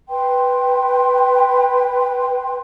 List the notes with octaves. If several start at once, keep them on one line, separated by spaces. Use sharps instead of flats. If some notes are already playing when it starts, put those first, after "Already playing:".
B4 G5 C6